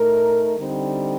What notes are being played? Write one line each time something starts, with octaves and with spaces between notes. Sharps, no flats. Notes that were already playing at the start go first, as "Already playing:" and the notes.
Already playing: A2 A3 D#4 A#4
D3 G3 C4 D#4